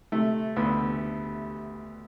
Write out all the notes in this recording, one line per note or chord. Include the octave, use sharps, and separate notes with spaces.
C3 A3
D2 B3